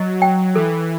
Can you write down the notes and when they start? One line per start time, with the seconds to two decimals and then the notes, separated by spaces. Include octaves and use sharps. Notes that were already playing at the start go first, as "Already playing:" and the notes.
Already playing: F#3 D#5
0.22 G5
0.55 E3 A4